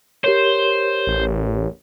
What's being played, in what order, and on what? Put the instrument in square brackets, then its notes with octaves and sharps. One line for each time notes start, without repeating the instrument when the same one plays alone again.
[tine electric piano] G4 A#4 C#5 [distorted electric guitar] C5
[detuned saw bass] A1